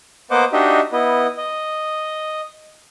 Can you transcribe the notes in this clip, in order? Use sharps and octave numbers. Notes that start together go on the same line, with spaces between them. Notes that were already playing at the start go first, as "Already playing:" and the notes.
A#3 B3 C5 D#5 F#5 D6
D4 D#4 F#4 G4 D#5 E5
B3 E4 D#5
D#5